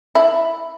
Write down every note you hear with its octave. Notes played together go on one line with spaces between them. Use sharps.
E4